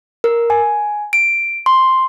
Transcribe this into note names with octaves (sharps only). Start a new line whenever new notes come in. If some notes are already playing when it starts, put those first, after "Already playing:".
A#4
G#5
D7
C6